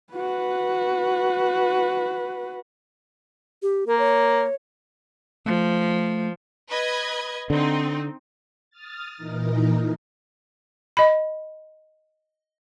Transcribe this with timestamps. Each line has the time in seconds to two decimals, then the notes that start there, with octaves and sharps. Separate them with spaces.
0.13 F#4 B4
3.62 G4
3.87 A#3 A#4
3.99 C#5
5.46 F3 A3
6.69 B4 D#5 G#6
7.50 D3 C4 D#4
8.70 D#6 F6 A6
9.17 A#2 E3 D#4 A#4
10.97 D#5 B5